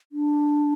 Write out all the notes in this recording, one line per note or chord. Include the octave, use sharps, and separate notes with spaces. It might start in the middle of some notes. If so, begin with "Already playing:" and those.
D4